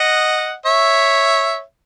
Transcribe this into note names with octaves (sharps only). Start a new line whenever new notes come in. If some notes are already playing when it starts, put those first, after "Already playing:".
Already playing: D#5 F#5
C#5 E5